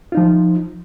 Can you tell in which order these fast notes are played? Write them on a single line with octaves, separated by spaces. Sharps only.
F4 D#4 F3